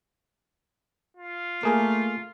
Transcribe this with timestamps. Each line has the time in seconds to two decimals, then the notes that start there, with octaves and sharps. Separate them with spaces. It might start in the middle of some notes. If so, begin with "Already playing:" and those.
1.17 F4
1.63 A3 A#3 G#4 A#4